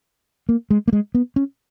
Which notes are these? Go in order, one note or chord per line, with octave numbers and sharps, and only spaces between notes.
A#3
G#3
A#3
G#3
B3
C#4